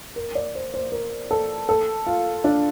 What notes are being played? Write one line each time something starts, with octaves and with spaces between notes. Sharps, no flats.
A#4
D5
C5
C5
A#4
A4
A4
F4
D4